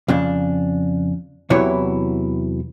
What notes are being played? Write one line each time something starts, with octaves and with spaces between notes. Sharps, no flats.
F2 C#3 D4
E2 C3 E3 F#3 E4 C#5